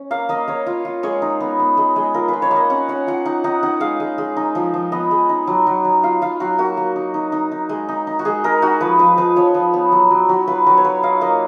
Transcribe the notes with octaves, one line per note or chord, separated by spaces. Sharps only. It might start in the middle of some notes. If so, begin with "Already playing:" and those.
Already playing: C#4
A#3 F5
A#3 D#5
A#3 C#5
F4
F4
G#3 C#5
D#4
B3
B3
G#3
G#3
F4 A#4
B4
F4
C#5
A#3
D#5
C#4 F#5
C#4 F#5
F4 F#5
D#4 F#5
D#4 F#5
D#4 F#5
G#3 F5
G#3
G#3
D#4
F3
F3
B3 D#5
G#3
D#4
F#3
F#3
F#3
F4 F5
F4 F5
F#3 F#4
A#3 F#4
A#3
D#4
D#4
D#4
D#4
G#3
D#4
D#4
F#4
G#3 G#4
G#3 A#4
D#4 F#4
F3 B4
F3 B4
F3 B4
F3 C#5
F3
B3
F#3
F#3
F#3
F4 B4
F#3 B4
C#5
F4 B4
D#4 F5
A#3 D#5